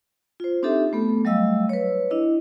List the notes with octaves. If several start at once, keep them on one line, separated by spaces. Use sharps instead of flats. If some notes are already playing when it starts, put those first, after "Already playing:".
F4 C5
C4 D4 D#4 G4 A4 E5
A3 B3 A4
F#3 G3 A3 D#5 F5 E6
B4 C#5
D4 E4 D#5